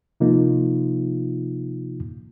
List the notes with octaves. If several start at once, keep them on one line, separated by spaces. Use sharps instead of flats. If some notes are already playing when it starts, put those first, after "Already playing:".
C3 F3 A#3 D#4 F4